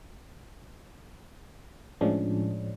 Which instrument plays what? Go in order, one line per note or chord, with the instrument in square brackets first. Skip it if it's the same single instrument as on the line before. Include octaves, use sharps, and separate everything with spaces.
[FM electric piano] A2 F3 G#3 C#4 D4